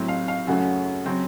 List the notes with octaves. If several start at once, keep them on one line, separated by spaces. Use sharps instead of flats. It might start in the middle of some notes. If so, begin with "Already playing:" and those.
Already playing: A2 F#3 C4
F5
F5
F#2 C#3 A3 C#4 F#4
C#3 F#3 C4